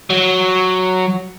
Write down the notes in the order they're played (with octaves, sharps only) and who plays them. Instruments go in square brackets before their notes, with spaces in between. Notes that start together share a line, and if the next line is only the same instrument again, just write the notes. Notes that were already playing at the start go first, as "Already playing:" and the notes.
[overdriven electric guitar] F#3